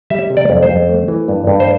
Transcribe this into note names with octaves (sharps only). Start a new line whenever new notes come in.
G3 E5
C3
D5
F2
C5
F2
A3
E3
G2
G2
C5